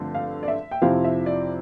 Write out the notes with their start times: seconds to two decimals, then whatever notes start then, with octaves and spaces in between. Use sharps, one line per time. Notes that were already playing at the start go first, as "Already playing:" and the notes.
Already playing: G2 D3 F3 A3 C4
0.15 F5
0.43 D5
0.48 E5
0.71 G5
0.82 F2 C3 F3 C4 E4 F5
1.04 E5
1.26 D5